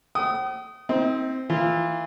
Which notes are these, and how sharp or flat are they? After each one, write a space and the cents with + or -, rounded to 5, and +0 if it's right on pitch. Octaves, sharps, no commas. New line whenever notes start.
G5 -45 D#6 +0
C4 +0 D#4 +35
E3 -20 F4 -15